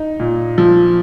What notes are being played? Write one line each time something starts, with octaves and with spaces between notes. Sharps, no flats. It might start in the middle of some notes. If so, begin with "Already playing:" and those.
Already playing: D#4
A#2
F3